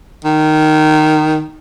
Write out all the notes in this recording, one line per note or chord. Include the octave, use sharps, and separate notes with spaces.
D#3